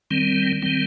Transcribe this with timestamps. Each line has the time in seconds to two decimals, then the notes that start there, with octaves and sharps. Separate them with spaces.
0.11 D#3 G3 C4
0.62 D#3 G3 C4